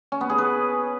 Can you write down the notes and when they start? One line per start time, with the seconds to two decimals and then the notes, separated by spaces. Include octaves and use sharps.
0.12 C#4
0.21 B3
0.30 G#4
0.38 B4